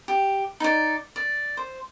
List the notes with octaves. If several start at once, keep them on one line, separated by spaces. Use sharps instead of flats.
G4
D#4 D5
D5
C5